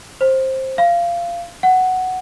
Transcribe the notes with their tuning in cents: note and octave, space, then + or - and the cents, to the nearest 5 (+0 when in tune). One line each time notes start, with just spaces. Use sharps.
C5 +15
F5 -20
F#5 +5